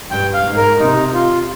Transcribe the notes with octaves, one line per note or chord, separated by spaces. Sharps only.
G2 G5
F5
G#2
A#4
C3 D#4
F4